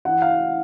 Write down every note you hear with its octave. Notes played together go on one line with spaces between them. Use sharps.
E3 F#5
F5